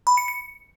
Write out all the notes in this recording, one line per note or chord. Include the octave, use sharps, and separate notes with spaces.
B5
C#7
C#7